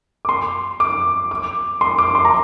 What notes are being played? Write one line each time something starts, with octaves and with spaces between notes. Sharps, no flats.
D6
C6
D6
D6
C6
D6
C6
A#5